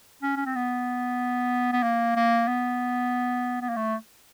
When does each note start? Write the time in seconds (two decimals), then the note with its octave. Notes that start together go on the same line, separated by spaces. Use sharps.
0.23 C#4
0.36 C#4
0.46 C4
0.55 B3
1.72 B3
1.83 A#3
2.16 A#3
2.48 B3
3.61 B3
3.69 A#3
3.76 A3